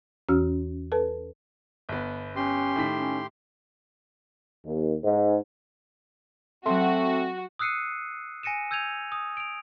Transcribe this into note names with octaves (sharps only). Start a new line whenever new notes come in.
E2 E3 C#4 F#4 E6 F6
A4 B4 A5
G1 B3
C#4 G4 C6
A2 D#3 B6
C#4
D#2
G#2
F#3 A3 C4 F#4 C6
D#6 E6 F#6 C7 C#7 D#7
G#5 A#6 C#7 D#7 E7
E6 G6 G#6 D#7 F7
D#6
D7 F7